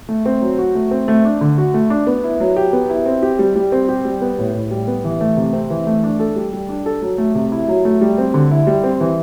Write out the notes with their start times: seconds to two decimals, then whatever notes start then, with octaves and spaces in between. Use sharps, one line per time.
0.09 A3
0.26 C4
0.42 F#3
0.58 F#4
0.75 A3
0.91 C4
1.08 A3
1.25 D4
1.41 D3
1.58 F#4
1.74 A3
1.90 D4
2.07 B3
2.24 E4
2.40 F#3
2.56 G4
2.73 B3
2.90 E4
3.06 C4
3.23 G4
3.39 G3
3.56 G3
3.72 C4
3.89 G4
4.05 G3
4.22 B3
4.38 A2
4.55 A2
4.71 G3
4.87 B3
5.04 E3
5.21 A3
5.37 C3
5.53 C4
5.70 E3
5.87 A3
6.03 D4
6.20 A4
6.36 G3
6.53 G3
6.69 D4
6.86 A4
7.02 F#3
7.18 A3
7.35 C3
7.52 E4
7.68 F#3
7.85 A3
8.01 G3
8.18 C4
8.34 D3
8.51 E4
8.67 G3
8.84 C4
9.00 E3